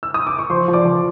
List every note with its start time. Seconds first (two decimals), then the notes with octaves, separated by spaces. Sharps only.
0.03 E6
0.14 D#6
0.27 D6
0.39 C#6
0.50 F3 C5 C6
0.68 F3
0.73 D5 D6
0.85 F3